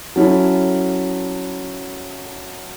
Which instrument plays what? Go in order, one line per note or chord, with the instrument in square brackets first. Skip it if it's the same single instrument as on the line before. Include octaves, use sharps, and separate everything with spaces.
[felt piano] F#3 C#4 E4 A4